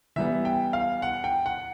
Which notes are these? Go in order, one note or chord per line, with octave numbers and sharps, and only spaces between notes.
E3 G3 B3 E5
G5
F5
F#5
G5
F#5